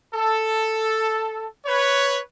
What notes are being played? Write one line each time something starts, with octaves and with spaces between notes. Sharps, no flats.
A4
B4 C#5